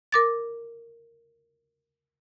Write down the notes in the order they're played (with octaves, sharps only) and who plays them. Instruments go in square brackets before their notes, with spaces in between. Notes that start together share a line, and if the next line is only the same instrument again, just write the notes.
[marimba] A#4 D6 A6